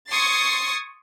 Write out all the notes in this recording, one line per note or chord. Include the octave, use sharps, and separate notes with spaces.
C6 C#6 D#6 G#6 A6 C7